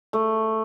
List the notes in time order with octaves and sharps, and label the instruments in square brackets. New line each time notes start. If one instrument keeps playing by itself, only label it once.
[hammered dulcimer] A3